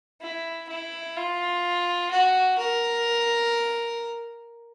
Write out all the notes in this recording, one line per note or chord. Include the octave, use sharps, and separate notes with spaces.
E4
E4
F4
F#4
A#4